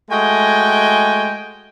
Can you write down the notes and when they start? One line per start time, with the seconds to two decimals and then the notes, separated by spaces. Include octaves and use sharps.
0.11 G#3 A3 F#4 D#5 G5 G#5